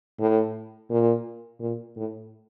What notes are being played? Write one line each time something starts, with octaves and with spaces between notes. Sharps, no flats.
A2
A#2
A#2
A2